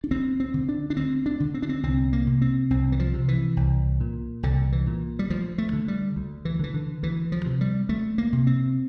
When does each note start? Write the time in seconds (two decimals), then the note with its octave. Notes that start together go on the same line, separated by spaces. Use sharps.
0.04 D4
0.11 D2 C4
0.40 C4
0.54 D3
0.69 D4
0.90 D4
0.97 D2 C4
1.26 D4
1.40 D3
1.54 C4
1.62 D4
1.69 C4
1.83 C2 C4
2.13 A#3
2.27 C3
2.42 C4
2.70 C2 C4
2.92 E3
3.00 F3
3.14 C3
3.28 E3
3.57 C2
4.00 A#2
4.43 C2 D3
4.72 E3
4.87 A#2
5.19 G3
5.30 D2 F3
5.58 A3
5.73 D3
5.88 G3
6.16 D2
6.45 E3
6.59 D3 E3
6.74 D3
7.03 D2 E3
7.32 F3
7.46 C3
7.61 G3
7.89 D2 A3
8.18 A#3
8.33 C3
8.47 C4